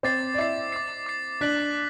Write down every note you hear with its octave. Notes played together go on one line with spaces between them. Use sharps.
C4 C5 D6 A6 C7
D5
E4 E5 D6 A6 C7
D6 A6 C7
D6 A6 C7
D4 D5 F#6 B6 F#7